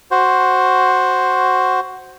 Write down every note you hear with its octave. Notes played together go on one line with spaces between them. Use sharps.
F#4 C5